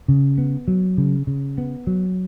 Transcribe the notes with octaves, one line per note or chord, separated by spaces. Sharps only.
C#3
B3
F#3
C#3
C#3
B3
F#3